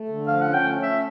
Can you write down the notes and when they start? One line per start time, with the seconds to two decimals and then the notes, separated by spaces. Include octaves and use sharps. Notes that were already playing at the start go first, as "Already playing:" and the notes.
Already playing: A3
0.08 D3
0.27 F3 F5
0.41 C#4 F#5
0.54 G5
0.64 A3
0.82 C#4 E5